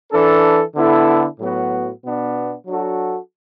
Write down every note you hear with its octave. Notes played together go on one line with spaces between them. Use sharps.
E3 D4 A4
D3 B3 E4 A4
A2 F#3 B3 F#4
B2 B3 D4
F#3 D4 F#4 A4